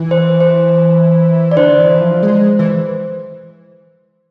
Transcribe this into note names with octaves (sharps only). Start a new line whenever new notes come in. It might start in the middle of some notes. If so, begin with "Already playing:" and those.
Already playing: E3
C5
C5
D5
D3 C5
E3
F3
G#3
E3